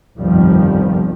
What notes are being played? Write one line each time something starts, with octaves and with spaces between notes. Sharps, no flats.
G1 C2 F2 D#3 F3 G3